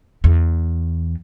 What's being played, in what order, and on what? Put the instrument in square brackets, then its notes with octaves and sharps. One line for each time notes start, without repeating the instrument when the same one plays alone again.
[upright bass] E2